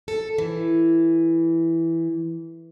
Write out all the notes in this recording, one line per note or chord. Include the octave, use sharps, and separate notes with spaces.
A4
E3